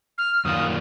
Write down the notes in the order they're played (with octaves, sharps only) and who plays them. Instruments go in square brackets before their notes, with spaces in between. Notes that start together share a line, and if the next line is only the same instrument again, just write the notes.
[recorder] F6
[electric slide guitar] F#2 D#3 A#3 F4 [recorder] D#6